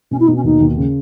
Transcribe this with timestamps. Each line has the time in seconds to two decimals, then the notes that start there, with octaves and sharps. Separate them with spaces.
0.11 B2 C#4
0.19 E4
0.27 B2 D#4
0.36 C#4
0.44 D#2 D#4
0.61 D#2
0.77 C#3